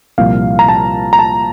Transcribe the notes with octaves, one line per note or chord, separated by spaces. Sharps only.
C2 A#2 F3 F5
A#5
A5
A#5
A5